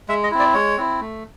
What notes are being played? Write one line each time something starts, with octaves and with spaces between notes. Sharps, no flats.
G#3 E5
D#5
C4 E4
D5
G#3 C#5
C4 E4
A3